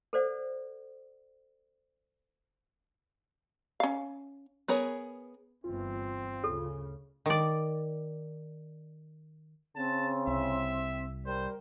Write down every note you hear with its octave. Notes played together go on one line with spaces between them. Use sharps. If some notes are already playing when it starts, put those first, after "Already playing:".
A4 C5 D5 F#5
C#4 F5
B3 G#4 A#4 C#5
G1 E3 C4 F4
D2 C#3 A4
D#3 D5
C#3 C4 A5
C2 E5
G3 A#4 C5